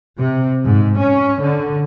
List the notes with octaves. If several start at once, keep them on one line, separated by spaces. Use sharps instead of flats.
C3
G#2
C#4
D3